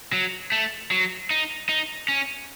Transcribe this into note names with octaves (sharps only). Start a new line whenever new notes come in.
F#3
A3
F#3
D#4
D#4
C#4